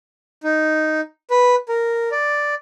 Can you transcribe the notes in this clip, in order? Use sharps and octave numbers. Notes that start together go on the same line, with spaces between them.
D#4
B4
A#4
D5